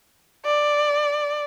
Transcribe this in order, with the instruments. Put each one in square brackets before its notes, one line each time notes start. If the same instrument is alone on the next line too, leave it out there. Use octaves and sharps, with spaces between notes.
[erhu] D5